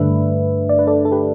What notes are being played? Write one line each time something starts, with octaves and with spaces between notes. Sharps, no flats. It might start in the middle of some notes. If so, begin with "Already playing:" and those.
Already playing: G2 D3 A3 D4 B4 E5
D5
B4
A4 D5
A4
G4 B4